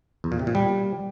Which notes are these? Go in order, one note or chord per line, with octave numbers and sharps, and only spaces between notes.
E2
A#2
C3
A#2
G3